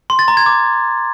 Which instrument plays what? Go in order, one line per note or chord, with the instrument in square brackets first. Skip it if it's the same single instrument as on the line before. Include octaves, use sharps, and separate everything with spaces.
[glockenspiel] C6
A6
A#5
G#6
D6